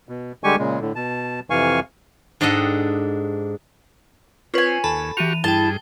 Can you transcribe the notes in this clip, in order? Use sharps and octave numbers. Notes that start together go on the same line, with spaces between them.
B2
D3 G3 G#3 G4 G#5 C#6
A#2 C#3 G#3
A2 D3
B2 A5
F2 C3 E3 F5 G#5 C#6
G#2 D4 G4 A4 D#5 F#5
C4 F4 B4 C#5 G#5
D#2 A4 A5 B5
E3 F#4 G4 C#6 D#7 F7
G2 E4 G#4 G5 A5 G7